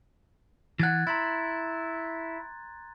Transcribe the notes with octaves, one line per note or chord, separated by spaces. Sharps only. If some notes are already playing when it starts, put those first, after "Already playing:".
E3 F#5 F#6 G#6 A6
E4 A#5 C6 A6